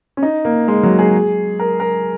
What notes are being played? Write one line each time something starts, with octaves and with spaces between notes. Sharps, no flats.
C#4
D#4
A#3
G#3
F#3
G#4
A#4
A#4